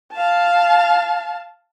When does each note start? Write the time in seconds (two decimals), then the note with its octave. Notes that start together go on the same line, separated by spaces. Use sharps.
0.12 F5 A5